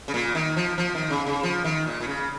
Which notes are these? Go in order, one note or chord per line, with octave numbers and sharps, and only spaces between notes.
C#3
A#2
D#3
F3
F3
D#3
C#3
C#3
F3
D#3
A#2
A#2
C#3